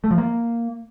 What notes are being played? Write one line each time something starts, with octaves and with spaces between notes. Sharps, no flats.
A3
F3
A#3